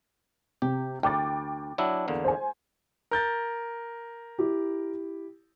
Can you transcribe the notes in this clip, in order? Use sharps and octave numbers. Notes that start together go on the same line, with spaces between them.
C3 G4
D2 G5 D6 A6
F#3 D4 E4
E2 D3 A#3
C5 G#5
A#4 G6 A6
E4 G4